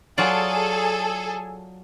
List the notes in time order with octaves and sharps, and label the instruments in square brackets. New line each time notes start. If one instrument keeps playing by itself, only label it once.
[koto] F#3 F4 D5 [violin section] G#4 A4 G#5